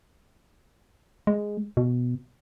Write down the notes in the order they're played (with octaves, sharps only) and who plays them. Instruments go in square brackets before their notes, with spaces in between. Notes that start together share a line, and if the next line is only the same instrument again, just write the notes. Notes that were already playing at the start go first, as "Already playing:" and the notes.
[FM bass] G#3
B2